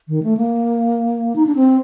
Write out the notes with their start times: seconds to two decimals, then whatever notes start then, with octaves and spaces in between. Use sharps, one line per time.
0.08 D#3
0.23 A3
0.37 A#3
1.36 D#4
1.46 D4
1.55 C4